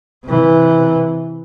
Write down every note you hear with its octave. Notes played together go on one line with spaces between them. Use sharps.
C3 E3